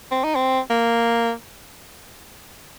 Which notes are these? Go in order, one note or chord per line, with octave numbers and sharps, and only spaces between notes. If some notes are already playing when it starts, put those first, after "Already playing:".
C4
D#4
C4
A#3